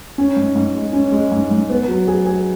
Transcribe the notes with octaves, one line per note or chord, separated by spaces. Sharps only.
C#4
G#2
G#2
G#3
C#4
G#3
G#2
G#2
B3
F#3
G#4
G#4